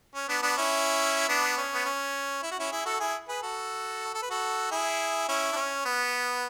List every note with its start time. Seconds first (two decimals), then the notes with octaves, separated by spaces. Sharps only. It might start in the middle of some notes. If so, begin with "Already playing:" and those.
0.15 C#4
0.29 B3 D4
0.43 B3 D4
0.57 C#4 E4
1.29 B3 D4
1.57 C#4
1.74 B3
1.85 C#4
2.42 E4
2.51 F#4
2.59 C#4 E4
2.72 E4 G#4
2.86 F#4 A4
3.00 E4 G#4
3.29 G#4 B4
3.43 F#4 A4
4.15 A4
4.23 B4
4.30 F#4 A4
4.71 E4 G#4
5.29 C#4 E4
5.53 D4
5.57 C#4
5.85 B3